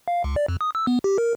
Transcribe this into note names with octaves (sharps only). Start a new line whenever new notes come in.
F5
C#2
D5
F2
D#6
E6
B3
G4
A#4